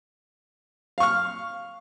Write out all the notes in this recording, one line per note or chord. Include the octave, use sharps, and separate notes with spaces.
F5 C#6 F6